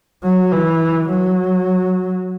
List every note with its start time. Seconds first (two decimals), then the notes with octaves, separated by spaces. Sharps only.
0.23 F#3
0.52 E3
1.09 F#3